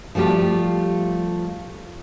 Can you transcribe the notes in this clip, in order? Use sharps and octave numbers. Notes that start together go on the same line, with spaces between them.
F3 G3 A3 F4 G4